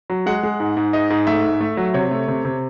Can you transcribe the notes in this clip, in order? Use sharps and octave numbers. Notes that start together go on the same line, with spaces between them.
F#3
G#3 F#5
G#3
G#2
G#2
G#2 D#5
G#2
A3 E5
G#2
A3
F#3
C3 C#5
A3
C3
C3